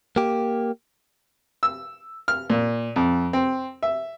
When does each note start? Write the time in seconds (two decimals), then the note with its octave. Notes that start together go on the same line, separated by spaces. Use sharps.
0.16 A#3 G4
1.63 E6
2.28 F6
2.50 A#2
2.96 F2
3.33 C4
3.83 E5